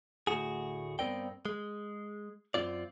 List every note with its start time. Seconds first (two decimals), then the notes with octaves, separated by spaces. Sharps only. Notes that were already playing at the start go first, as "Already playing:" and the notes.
0.27 D2 A2 F#4 G#4
0.99 G2 B3 C4 A#4 D5 G5
1.46 G#3
2.54 F#2 C#3 C4 F4 D5